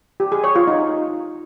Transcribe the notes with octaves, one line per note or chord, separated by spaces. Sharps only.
G4
G#4
C#5
F4
D#4